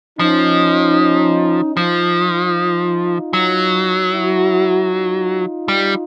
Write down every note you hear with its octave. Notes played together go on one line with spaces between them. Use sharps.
F3 C#4 D#4
F3 D#4 F4
F#3
E4 F#4
D#4 F4
G3